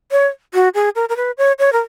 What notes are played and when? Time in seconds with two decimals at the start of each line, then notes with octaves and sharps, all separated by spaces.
0.12 C#5
0.54 F#4
0.75 G#4
0.96 A#4
1.09 A#4
1.17 B4
1.38 C#5
1.59 C#5
1.73 A#4